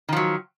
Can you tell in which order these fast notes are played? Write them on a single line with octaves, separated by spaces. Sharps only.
D#3 F3 F#3